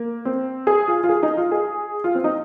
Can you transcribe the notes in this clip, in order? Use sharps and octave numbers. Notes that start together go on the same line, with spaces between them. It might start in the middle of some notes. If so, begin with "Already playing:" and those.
Already playing: A#3
C4
G#4
F4
F4
G#4
D#4
F4
G#4
F4
C4
D#4